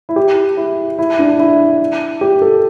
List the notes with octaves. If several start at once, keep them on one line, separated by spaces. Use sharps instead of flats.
E4
G4
E4
E4
D4
E4
G4
A4